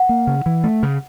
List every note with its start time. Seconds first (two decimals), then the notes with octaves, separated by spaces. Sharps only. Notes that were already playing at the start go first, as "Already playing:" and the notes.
Already playing: F#5
0.09 A#3
0.27 C#3
0.46 E3
0.64 A3
0.83 C#3